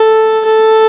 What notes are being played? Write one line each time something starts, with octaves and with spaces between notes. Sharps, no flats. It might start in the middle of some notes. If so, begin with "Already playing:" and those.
Already playing: A4
A4